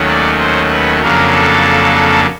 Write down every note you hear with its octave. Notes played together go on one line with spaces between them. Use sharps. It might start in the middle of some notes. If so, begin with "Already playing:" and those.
Already playing: D#2 D#3 F#3 A3 C#4
D5
C5
B4
F2 C#3 F#3 A#3 D4 A#4
A4